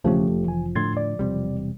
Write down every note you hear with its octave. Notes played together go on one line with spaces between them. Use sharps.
E1 C#3 F3 A3 C#4 G4 A4
F1
E3 G#5
A2 D3 A3 C6 G#6 A6
D5
E1 C3 G3